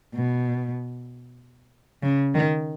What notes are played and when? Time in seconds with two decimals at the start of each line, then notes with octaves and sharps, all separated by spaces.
0.14 B2
2.03 C#3
2.34 D#3